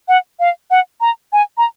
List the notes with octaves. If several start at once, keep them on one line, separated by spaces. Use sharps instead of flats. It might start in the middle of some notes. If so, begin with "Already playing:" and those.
F#5
F5
F#5
A#5
G#5
A#5